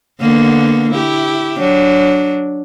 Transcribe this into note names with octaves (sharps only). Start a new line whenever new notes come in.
D3 A#3 B3
E4 G4
F#3 D4